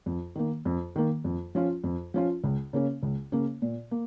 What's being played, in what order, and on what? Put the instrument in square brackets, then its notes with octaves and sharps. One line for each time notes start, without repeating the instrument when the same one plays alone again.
[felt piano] F2
D#3 A#3
F2
D#3 A#3
F2
F3 C#4 F4
F2
F3 C#4 F4
C#2
C#3 A#3 C#4
C#2
C#3 A#3 C#4
A#2
A#3